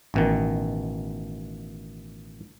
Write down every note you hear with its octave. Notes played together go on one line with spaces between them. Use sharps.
A1 B2 D#3